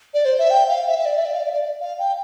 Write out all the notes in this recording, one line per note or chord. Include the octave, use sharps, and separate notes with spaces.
D5
C5
E5
G5
F5
E5
E5
D5
E5
D5
F5
D5
D5
F5
G5